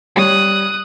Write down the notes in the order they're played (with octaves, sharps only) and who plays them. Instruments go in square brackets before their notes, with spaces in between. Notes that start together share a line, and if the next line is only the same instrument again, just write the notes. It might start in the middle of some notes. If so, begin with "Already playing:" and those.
[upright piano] G3 C#5 [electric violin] D#6 F#6